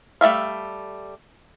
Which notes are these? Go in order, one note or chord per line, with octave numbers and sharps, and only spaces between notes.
G3 A3 E5 F5